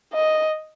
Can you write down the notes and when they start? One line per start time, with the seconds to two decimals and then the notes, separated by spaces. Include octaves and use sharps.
0.14 D#5